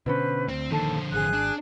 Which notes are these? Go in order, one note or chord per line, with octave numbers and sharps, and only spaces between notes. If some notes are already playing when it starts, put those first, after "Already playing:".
B2 D3 C#4 B4 C5
D2 C4
D#1 D#2 D3 D#3 F3 A4
G#1 G#4 F#6
D4